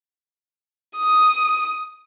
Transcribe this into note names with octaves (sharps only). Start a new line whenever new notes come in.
D#6